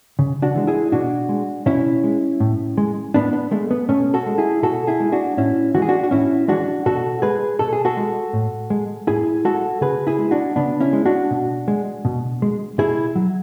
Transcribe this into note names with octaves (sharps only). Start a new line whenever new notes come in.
C#3
D4 F#4
E3 G#3
E4 G#4
B2 D4 F#4
G#3
B2 C#4 E4
G#3
A2
G#3
A2 B3 D4
B3
G#3 A3
B3
B2 A3 C#4
F#4 A4
G#3
E4 G#4
B2 F#4 A4
E4 G#4
G#3
D4 F#4
A2 C#4 E4
E3 G#3 F#4 G#4
D4 F#4
F#4
A2 C#4 E4
E3 G#3 D4 F#4
B2 F#4 A4
G#3 G#4 B4
B2 A4
G#4
F#4 A4
G#3
A2
G#3
A2 E4 G#4
G#3 F#4 A4
C#3 G#4 B4
E4 G#4
G#3
D4 F#4
C#3 B3 D4
C#4 E4
G#3
D4 F#4
B2
G#3
B2
G#3
B2 E4 G#4
F#3